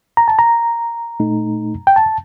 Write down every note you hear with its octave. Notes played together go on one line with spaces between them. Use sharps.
A#5
A5
A#5
A#2 A3 D#4
G5
A5